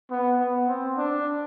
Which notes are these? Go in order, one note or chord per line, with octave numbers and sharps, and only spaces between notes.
B3
B3
C4
D4